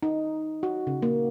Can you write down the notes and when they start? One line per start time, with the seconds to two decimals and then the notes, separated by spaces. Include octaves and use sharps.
0.03 D#4
0.63 F#4
0.87 C#3
1.02 A#3